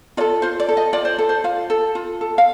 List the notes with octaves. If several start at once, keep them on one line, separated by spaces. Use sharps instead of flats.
F4 A4 D5
F4 C5
D5
A4
D#5
F4 D5
C5
A4
C5
F4 F5
A4
F4
A4
F5